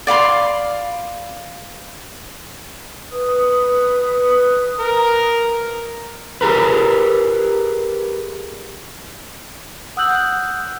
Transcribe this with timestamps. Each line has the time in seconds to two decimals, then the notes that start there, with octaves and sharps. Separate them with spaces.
0.07 D5 F5 B5 C6
3.12 B4 D#6
4.79 A#4
6.41 G4 G#4 A#4 B4
9.97 F#5 D#6 E6 F#6 G6 F#7